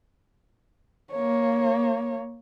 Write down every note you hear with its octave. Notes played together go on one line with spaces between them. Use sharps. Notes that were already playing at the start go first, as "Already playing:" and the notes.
A#3 C#5